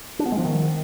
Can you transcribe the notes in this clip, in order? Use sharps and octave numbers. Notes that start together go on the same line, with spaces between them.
D4
B3
G#3
F3
D#3